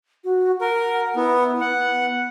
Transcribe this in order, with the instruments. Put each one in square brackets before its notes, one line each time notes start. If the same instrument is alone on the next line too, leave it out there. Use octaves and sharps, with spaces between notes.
[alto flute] F#4
[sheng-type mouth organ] A#4 [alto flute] F#5
[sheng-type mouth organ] B3 [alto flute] E4
[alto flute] B3 [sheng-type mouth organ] F#5